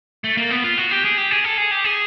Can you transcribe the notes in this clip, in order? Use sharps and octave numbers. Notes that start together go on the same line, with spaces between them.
A3
A#3
B3
F4
F#4
G4
G#4
G4
G#4
A4
G#4
G4
G#4